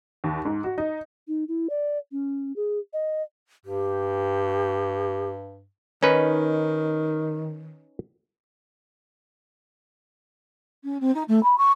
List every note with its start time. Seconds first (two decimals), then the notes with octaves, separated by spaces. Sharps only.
0.24 D#2
0.45 G#2
0.64 F#4
0.78 D#4
1.28 D#4
1.48 E4
1.70 D5
2.12 C#4
2.56 G#4
2.93 D#5
3.65 G2 G4
6.03 D#3 C#4 D#4 B4
10.84 C#4
11.00 C4
11.14 D#4
11.28 A3
11.43 B5
11.57 C#6